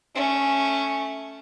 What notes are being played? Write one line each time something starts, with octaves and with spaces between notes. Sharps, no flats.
A3 C#4